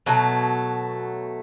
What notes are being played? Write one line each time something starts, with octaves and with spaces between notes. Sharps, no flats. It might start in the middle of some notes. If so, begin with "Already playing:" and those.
B2 F#3 A3